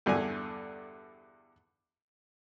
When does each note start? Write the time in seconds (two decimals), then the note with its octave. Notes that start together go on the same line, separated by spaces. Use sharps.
0.06 E2 G2 D3 G#5